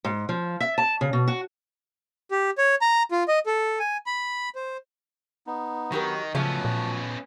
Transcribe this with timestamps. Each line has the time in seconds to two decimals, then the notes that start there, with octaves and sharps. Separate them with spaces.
0.05 G#2
0.29 F3
0.60 E5
0.78 A5
1.01 C#3
1.13 B2
1.28 F#4
2.31 G4
2.58 C#5
2.81 A#5
3.12 F4
3.28 D#5
3.46 A4
3.79 G#5
4.06 B5
4.55 C5
5.47 B3 D#4
5.92 D#3 F#3 G4 A#4
6.35 A2 C#3 F3 F#3 B3 C#4 A5
6.65 A#2